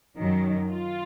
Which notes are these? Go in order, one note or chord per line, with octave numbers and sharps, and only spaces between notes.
F#2 D#3 F#3
F4